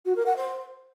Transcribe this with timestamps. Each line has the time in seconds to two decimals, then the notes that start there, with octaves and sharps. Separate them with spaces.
0.05 F#4
0.15 A#4
0.26 F#5
0.36 C5